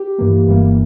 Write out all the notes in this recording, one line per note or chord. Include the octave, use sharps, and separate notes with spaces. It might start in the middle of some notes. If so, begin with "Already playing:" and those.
Already playing: G4
G2 E3 A#3
G1 G2 E3 G3 A#3